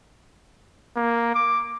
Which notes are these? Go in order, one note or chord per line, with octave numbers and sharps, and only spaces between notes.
A#3
D6